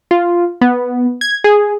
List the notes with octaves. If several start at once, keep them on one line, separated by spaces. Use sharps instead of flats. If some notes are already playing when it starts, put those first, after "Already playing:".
F4
B3
G#6
G#4